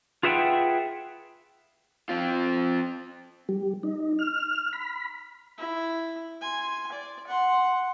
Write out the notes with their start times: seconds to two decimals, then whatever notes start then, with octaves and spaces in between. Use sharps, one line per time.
0.23 F4 G#4 B4 E5 F#5 G5
2.09 C4 F4
3.49 G3
3.83 D#4
4.19 F6
4.73 B5
5.58 E4
6.42 G#5 C6
6.92 D5
7.27 F#5 C6